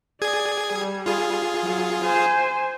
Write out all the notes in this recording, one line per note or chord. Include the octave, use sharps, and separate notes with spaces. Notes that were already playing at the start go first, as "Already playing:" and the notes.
G#4 D5 G#6
G3
F4 G#4
F#3
C5 G#5